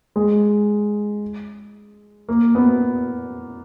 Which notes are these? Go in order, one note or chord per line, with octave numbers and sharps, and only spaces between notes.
G#3
A#3
B3